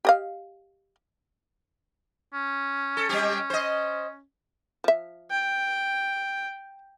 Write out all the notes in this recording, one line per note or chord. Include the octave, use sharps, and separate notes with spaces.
G4 D#5 F5
C#4
A4
G3 C4 G4
C5 D#5
F3 E5
G5